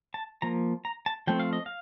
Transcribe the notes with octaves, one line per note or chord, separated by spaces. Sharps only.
A5
F3 A#3 A#5
A#5
A5
F3 A3 C4 G5
F5
D#5
F5